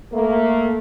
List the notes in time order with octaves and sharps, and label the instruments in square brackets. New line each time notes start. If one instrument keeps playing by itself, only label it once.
[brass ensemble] A3 A#3